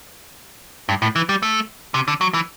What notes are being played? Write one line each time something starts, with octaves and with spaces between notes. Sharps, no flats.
G2
A2
E3
G3
A3
C3
D3
F#3
E3